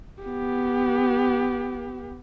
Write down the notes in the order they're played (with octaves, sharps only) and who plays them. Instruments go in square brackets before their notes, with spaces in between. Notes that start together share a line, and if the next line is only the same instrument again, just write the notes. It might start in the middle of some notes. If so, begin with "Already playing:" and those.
[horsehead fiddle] B3 G4